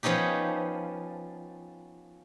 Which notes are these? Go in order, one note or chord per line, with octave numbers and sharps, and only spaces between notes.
F3 B3 C#4 D#4 G4